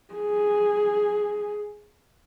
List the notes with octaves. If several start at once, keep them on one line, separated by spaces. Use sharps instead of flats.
G#4